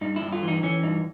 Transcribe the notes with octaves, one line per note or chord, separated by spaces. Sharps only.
G2 D#4
E4
G2
F4
E3 D#4
E3 C#4
G2 D#4